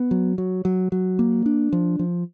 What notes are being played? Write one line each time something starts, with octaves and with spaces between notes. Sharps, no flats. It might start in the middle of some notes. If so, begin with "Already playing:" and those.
Already playing: B3
F#3
F#3
F#3
F#3
A#3
D4
F3
F3